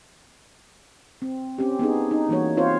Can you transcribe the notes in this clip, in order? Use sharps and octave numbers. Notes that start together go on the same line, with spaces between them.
C4
C4 C#4 G4
B3 D4 D#4 G#4
D#4
E3 G3 A#3 F#4 C#5
C4 F4 C5 C#5